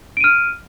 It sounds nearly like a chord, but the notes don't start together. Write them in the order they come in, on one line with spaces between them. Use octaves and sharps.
D7 D#7 F6